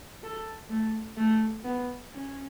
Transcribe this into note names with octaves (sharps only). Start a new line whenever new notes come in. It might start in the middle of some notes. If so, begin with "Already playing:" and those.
A4
A3
A3
B3
C#4